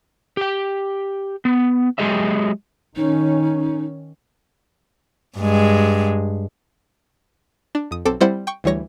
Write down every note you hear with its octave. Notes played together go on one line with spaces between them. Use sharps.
G4 G5
B3
F#3 G#3 G4 G#4 D#5 E5
D#3 C#4 D#4
G2 G#3
D4
F2 D#6
B1 C4 A4 D6 A6
G3 C4 E4 C5 D5 F#5
G5 C#6
D2 E3 G3 C#5 A#6